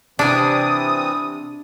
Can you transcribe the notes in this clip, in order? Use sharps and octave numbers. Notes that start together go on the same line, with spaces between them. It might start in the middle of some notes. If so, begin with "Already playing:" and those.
C3 E3 C4 D4 E4 D#6